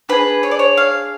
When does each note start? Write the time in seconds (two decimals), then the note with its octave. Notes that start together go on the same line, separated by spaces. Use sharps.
0.09 D4 G#4 B4
0.43 C#5
0.51 D5
0.59 C#5
0.77 F5